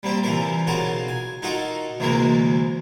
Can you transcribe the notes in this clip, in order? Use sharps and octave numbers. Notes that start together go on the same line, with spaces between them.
G3 A#3 C4 G4
C3 E3 G3 F4 A#4
B1 C#3 F4 F#4 A#4 A5
G#5
D#4 F4 F#4 A4 A#4 D#5
D2 C3 E3 G#3 A#3 A#4